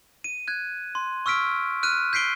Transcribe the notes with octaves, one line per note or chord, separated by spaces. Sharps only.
D#7
F#6 G#6
C6
C#6 E6 F6 B6 D7
F6 F#6 D#7
G6 B6 C7 D7 G7